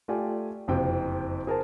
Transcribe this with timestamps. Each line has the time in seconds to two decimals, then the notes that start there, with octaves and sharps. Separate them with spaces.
0.08 A3 F4 G4 D5 G#5
0.68 F#1 F2 C3 F4 G5
1.47 G#4 A#4 C5 A5